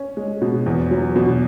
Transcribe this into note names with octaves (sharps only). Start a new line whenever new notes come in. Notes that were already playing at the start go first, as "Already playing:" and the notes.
Already playing: C#4
G#3
B2
E2
F#3
B2